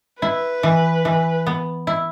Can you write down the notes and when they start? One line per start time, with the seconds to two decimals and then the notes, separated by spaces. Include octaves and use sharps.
0.22 E4 B4
0.63 E3
1.05 E3
1.47 B3
1.87 E4